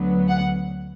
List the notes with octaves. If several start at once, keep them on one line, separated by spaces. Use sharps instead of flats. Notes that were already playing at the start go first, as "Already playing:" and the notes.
Already playing: D2 D3 F#3 B3
F#5